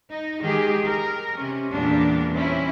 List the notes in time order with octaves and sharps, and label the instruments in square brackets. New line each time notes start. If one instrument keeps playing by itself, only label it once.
[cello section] D#4
D#3 G#3 G4 G#4
A#4
C3 C#4
E2 A#2 G3 B3 D4
C4 C#4 E4